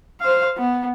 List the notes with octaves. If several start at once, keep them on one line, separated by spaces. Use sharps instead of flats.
C5 F5
B3